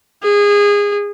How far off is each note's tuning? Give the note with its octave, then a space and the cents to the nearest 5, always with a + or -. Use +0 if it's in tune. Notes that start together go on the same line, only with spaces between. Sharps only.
G#4 -25